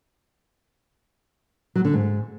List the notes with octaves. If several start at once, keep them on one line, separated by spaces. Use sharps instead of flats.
F#3
D3
G#2